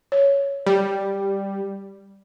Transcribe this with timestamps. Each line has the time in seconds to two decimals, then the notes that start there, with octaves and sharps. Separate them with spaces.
0.12 C#5
0.66 G3